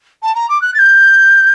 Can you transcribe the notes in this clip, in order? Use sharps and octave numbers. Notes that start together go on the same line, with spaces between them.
A5
A#5
D6
F#6
A6
G6